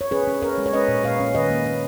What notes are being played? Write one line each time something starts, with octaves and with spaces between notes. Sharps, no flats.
C#5
C#4 G#4 B4
C#4
C#4 A#4 C#5
G#3
C#5
C#4 B4 D#5
A#2
A#2 C#5 F5
C#4
D#3 B4 D#5
A#3
C#4